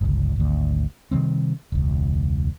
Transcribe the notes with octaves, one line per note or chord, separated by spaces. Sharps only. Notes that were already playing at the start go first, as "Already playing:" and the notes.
G1 C#2
G#1 D2
C3 D#3 G3 C4
E1 C#2